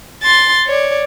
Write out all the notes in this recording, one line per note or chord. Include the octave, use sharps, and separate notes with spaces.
C6 A6
C#5 D5